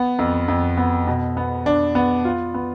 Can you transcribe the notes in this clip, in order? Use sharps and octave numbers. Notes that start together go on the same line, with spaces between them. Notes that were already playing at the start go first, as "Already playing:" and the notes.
Already playing: B3
F2
F2
B3
B2
B3
D4
B3
F4
B3